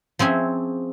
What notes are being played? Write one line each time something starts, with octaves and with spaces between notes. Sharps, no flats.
F3 C4 C#4 G#4 E5